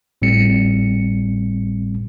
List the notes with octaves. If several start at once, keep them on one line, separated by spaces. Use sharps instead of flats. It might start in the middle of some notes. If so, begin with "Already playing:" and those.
G#1 A2 G3 C4 C#7